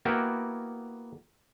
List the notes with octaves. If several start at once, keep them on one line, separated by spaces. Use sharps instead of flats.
A#3 B3 E4 F#4 G4 A#4